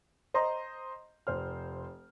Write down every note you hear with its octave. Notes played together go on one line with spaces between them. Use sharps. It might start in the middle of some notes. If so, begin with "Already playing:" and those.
C5 D#5 A#5 C6
F1 C5 F6